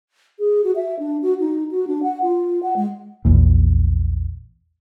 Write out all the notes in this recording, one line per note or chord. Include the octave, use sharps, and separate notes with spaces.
G#4
F#4
E5
D4
F#4
D#4
F#4
D4
F#5
F4
F#5
G#3
A#1 E2 A#2